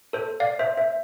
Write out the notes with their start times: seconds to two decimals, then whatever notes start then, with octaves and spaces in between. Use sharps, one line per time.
0.13 A4 C5
0.40 D5 F5
0.59 C5 E5
0.77 C5 E5